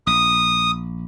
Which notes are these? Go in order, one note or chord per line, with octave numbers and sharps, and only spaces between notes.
A#1 D#6